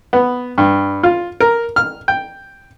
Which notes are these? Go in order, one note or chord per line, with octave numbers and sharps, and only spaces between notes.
B3
G2
F4
A#4
F6
G5